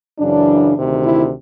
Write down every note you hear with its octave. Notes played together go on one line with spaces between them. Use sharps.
F#2 C#3 E3 D4
D2 C3 D#3
E4